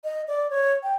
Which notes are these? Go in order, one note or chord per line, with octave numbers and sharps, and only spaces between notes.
D#5
D5
C#5
G5